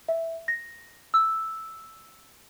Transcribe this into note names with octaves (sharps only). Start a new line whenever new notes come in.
E5
A#6
E6